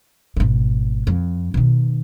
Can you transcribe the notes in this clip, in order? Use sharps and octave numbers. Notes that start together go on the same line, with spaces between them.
G#1 B2
F2
B2 D#3